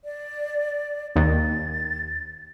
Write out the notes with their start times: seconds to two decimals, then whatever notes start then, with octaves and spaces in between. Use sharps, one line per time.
0.05 D5
1.16 D#2 A6